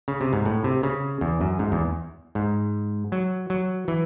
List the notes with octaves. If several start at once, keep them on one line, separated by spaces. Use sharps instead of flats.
C#3
C3
G#2
A2
C3
C#3
E2
F#2
G#2
E2
G#2
F#3
F#3
E3